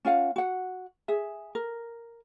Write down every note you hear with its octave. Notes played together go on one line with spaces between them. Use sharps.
C#4 F4 F5 F#5
F#4 F#5
G#4 E5
A#4